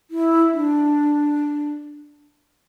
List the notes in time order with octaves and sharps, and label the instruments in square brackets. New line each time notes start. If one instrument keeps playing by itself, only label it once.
[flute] E4
D4